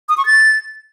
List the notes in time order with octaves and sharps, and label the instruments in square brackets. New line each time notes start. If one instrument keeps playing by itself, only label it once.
[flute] D#6
C#6
A6